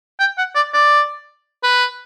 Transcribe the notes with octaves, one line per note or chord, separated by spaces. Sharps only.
G5
F#5
D5
D5
B4